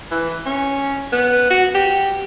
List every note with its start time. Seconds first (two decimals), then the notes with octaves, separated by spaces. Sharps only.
0.11 E3
0.46 C#4
1.12 B3
1.50 F#4
1.74 G4